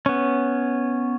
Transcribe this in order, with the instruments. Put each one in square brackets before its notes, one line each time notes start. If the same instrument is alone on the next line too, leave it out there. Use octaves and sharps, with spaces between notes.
[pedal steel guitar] B3 C#4